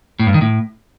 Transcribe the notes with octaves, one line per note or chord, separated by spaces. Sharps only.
A2
G2
D#3
A2